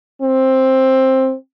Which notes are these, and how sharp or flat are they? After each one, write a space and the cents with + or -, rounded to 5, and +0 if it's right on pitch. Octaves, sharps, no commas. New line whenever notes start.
C4 +10